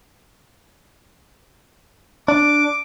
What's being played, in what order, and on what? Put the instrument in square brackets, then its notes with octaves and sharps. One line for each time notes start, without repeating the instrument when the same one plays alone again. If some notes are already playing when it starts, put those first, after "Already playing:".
[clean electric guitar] D4 [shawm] D6